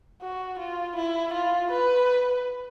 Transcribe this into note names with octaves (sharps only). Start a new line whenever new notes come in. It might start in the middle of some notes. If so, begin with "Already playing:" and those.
F#4
F4
E4
F4
B4